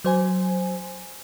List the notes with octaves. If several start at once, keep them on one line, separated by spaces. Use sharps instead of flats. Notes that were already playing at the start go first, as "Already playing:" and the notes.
F#3 C5 G#5